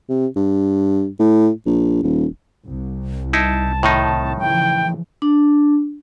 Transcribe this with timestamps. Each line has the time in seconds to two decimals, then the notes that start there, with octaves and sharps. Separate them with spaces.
0.10 C3
0.36 G2
1.20 A2
1.66 A#1
2.03 D#1
2.67 C2
3.33 D#4 E4 A5
3.83 A2 D#3 D#4
4.39 C#3 E3 F3 G5
5.22 D4